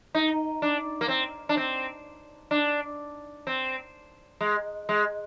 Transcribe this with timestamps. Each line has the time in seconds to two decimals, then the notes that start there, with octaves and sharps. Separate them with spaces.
0.14 D#4
0.62 D4
1.01 A#3
1.08 C4
1.49 D4
1.57 C4
2.51 D4
3.47 C4
4.41 G#3
4.89 G#3